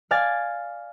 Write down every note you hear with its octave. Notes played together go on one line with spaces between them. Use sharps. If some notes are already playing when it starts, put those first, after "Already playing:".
D5 F5 G#5 A6